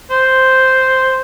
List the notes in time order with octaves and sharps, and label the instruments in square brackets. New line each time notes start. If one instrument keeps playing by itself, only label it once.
[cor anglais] C5